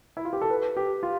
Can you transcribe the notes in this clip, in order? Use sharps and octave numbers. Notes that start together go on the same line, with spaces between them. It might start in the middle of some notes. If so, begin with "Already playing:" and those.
E4
F4
G4
A4
B4
G4
F4